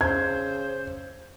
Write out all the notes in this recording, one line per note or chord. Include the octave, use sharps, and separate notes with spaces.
C#3 C5 G#6